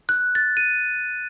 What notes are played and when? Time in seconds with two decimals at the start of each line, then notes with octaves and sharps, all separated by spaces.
0.09 F#6
0.35 A6
0.57 D#7